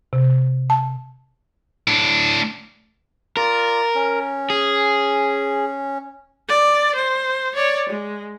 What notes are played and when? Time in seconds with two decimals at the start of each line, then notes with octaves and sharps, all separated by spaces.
0.13 C3
0.70 A5
1.87 A2 D4
3.37 F4 A#4 D5
3.95 C#4
4.50 G#4
6.48 D5
6.95 C5
7.55 C#5 D5
7.89 G#3